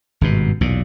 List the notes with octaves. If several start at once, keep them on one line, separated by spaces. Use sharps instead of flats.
G#1 G2 B2
B1 E2 A#2